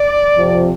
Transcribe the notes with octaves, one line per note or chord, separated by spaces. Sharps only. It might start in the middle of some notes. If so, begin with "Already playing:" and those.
Already playing: D5
F2 C3 F3